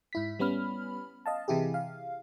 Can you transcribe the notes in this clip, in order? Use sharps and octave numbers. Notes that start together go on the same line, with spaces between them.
G#2 E4 B6
G3 B3 C#4 B5 F6
D#5 F5 A5
C3 E3 E4 G4 G#4
F5